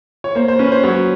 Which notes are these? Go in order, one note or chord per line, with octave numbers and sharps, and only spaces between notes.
C#5
A#3 C5
C5
C#4 B4
C5
F#3 C#5